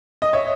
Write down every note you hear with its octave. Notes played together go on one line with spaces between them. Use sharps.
D#5
C#5 E5